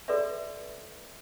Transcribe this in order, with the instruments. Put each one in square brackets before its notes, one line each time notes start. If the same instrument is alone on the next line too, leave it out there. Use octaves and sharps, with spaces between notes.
[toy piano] F#4 A4 B4 C#5 D5 E5